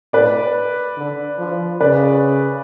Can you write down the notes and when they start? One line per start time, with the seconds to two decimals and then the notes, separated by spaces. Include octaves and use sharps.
0.13 A2 B4 D5
0.97 D3
1.38 F3
1.81 C#3 B4 D5